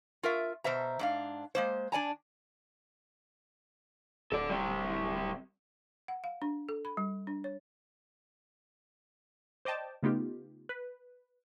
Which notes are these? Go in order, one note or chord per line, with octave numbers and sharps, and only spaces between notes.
F4 A#4 E5
B2 C5 E5 A#5
G#2 D4 F5
G#3 A#3 C5
D4 D5 G#5 A#5
D1 A4 D5
G3 C4
F#5
F5
D4
A4
B5
G3
D4
C#5
C5 D5 D#5 G5 A5
C#3 A3 B3 D#4 F4 G4
B4